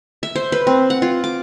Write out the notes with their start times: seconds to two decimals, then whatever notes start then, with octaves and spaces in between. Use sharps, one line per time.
0.23 E5
0.36 C5
0.52 B4
0.67 C4
0.90 F#5
1.02 F4
1.24 D6